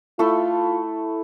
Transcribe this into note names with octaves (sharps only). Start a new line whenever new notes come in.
A3 E4 F4 A4